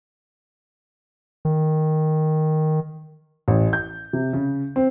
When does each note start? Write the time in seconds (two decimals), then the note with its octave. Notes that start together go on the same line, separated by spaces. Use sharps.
1.45 D#3
3.48 A1
3.73 G6
4.13 C3
4.33 C#3
4.76 C4